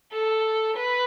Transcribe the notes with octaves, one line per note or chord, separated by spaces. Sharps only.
A4
B4